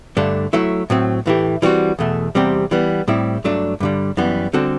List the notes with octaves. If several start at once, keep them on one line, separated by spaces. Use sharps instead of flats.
G2 D3 A3 D4
F#3 A3 E4
A2 F#3 C4
A2 E3 A3 E4 G4
E3 G3 C4 F#4
E2 B2 A3
E2 C3 G3 C4 G4
E3 G3 B3
A2 G3 C4 E4
G2 F#3 A3 D4
G2 D3 G3
F#2 E3 G3 B3
D3 G3 C4 F#4 A4